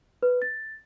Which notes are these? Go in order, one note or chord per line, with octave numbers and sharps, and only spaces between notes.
B4
A6